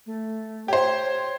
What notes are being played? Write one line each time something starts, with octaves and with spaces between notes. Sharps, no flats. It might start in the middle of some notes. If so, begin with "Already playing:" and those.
A3
G4 C5 C#5